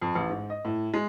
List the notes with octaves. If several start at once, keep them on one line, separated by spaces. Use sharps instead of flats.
F2
A1
G#2
D#5
A2
G#3